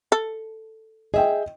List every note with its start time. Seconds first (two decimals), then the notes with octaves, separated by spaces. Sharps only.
0.12 A4
1.14 G#4 D#5 E5 G5